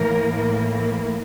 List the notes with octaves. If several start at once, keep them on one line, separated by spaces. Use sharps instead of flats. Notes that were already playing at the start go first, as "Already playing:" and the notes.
Already playing: A2 E3 A#3 A#4